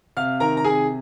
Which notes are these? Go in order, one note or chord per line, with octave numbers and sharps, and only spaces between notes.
C3 F5 F6
D#3 A#4 A#5
A#5
C3 G#4 G#5